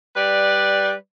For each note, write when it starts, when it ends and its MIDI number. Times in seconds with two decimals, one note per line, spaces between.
0.16 0.94 55
0.16 0.94 71
0.16 0.94 74